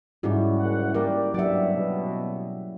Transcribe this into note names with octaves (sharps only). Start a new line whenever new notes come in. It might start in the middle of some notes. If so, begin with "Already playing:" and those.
G#2 G3 C#4 E4 F#4
F#1 F#5
G3 A#3 G4 A#4 D5
G2 F#3 D5 E5 F#5
B2